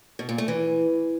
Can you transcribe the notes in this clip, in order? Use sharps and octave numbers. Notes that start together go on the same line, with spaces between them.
B2
A#2
A3
E3